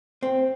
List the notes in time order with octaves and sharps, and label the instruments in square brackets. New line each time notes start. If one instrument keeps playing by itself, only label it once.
[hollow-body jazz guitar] C4